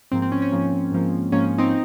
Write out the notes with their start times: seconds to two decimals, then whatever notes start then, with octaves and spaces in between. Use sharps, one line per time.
0.12 G#2 F3 A#3 C4
0.22 C4
0.32 C#4
0.42 C#4
0.52 G#2 F3 A#3
0.92 G#2 F3 A#3
1.32 G#2 F3 A#3 C#4
1.45 C#4
1.58 C4 D#4